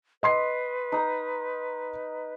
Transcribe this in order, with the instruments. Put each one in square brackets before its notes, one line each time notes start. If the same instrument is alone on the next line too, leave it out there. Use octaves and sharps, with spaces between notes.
[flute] B4 [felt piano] D#5 C6 C7
[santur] D#4 A#5